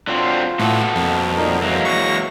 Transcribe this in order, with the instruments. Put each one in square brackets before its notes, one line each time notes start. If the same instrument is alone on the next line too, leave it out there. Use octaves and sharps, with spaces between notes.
[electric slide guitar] D3 F#3 C4 [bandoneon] F4
[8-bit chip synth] A2 [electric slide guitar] B3 F#4 A4
[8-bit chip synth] F2 [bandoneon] A#3
[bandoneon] A#2 D#4 A#4
[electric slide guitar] E3 G#3 A#3 [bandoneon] F#3
[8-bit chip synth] C#6 A#6